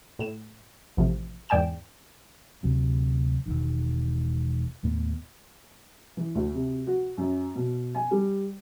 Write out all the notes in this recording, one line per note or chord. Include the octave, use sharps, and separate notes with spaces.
A2 E7
A1 C3 F3
E2 G#2 D5 G5 G#5 E7
D2 C3 F#3
E1 B1 D#3
D#2 A2 B3
E3
D2
C3
F#4
F#2
B2
G#5
G3